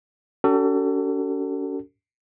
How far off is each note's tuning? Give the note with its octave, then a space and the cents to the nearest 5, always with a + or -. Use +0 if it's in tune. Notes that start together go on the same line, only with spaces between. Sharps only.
C#4 +45 F#4 +45 A4 +30